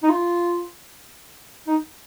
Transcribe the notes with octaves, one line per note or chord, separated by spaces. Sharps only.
D#4
F4
D#4